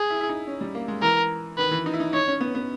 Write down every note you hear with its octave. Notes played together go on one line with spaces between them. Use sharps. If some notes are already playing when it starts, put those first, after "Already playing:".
Already playing: G#4
E4
E4
D#4
C#4
G3
A#3
G#3
E3 A#4
D#3 B4
E3
D#4
E4
D#4
D#4 C#5
C#4
B3
B3